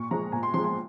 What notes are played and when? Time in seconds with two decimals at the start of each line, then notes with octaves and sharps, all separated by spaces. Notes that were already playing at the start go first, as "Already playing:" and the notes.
Already playing: A#2 C#6
0.11 F3 G#3 A#5
0.32 A#2 G#5
0.43 C6
0.54 F3 G#3 C6
0.64 C6